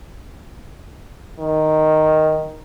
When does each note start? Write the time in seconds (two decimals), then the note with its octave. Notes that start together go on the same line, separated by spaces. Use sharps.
1.39 D#3